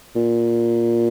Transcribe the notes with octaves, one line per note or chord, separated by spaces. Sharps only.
A#2